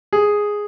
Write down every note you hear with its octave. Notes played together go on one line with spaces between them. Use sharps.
G#4